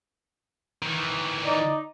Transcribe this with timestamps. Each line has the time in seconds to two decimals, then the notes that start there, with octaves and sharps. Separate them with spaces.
0.83 D#3 E3
1.46 D#4 D5